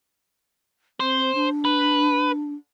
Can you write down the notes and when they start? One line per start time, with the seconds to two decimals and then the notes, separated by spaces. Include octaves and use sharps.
1.00 C4 C5
1.35 D4
1.65 B4